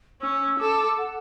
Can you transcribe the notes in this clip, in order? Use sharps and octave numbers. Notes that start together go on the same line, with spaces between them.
C#4 E6
A4 D6
F#5